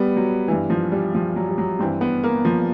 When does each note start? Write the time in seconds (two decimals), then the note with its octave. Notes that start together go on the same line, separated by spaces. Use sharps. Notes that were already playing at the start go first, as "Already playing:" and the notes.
Already playing: G3 B3
0.16 F#3
0.48 G2 E3
0.70 F3
0.92 G3
1.15 F3
1.36 F#3
1.49 G3
1.58 F#3
1.79 G2 E3 C4
2.01 B3
2.24 A#3
2.45 F3